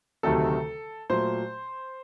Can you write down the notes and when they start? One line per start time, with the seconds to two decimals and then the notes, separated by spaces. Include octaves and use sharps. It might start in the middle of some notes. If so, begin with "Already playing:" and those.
0.23 D2 C3 D#3 F#3 A3 A4
1.10 A#2 F#3 A3 C5